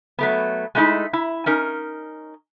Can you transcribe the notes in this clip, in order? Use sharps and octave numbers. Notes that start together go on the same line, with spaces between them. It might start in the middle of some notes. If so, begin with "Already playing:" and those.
F#3 A3 B3
G#3 A3 B3 D#4 E4
E4
C#4 D#4 A#4